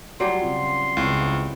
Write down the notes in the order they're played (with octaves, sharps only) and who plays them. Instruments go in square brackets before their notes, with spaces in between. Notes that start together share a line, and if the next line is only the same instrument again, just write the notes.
[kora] F#3 G3 G4 [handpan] D5 [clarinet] C6
[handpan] C#3 C4 F4
[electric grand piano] C#2 [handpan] B3 C4 E4